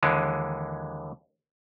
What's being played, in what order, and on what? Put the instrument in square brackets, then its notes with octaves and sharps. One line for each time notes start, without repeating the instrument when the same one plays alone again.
[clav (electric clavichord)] D#2 D3 E3 G#3